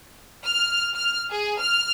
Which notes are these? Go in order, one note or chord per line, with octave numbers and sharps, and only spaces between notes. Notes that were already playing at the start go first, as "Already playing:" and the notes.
F6
F6
G#4
F6